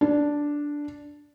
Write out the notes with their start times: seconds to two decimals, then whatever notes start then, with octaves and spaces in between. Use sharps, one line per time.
0.01 D4